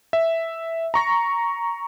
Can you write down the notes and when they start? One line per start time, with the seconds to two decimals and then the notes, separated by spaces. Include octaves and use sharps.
0.13 E5
0.94 A#5 C#6 A#6